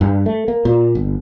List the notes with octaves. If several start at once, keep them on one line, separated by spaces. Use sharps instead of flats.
G2
A3
A#3
A#2
G1